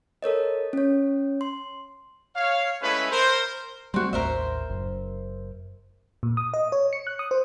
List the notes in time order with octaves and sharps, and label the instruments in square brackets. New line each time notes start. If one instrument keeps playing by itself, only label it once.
[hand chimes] A4 A#4 C#5 D#5
C#4 C#5
C6
[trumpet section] C#5 F5
G#3 A3 C#4 E4 B4
A#4 C5
[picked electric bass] G3 A3 [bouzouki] C4 F#4
[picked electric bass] A1 D#2 [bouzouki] A#4 C5 E5
[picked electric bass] F#1
[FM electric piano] A#2
D#6
D#5
C#5
C#7
F#6
D#6
C5